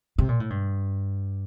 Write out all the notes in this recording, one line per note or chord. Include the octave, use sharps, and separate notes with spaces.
C3
A#2
A2
G2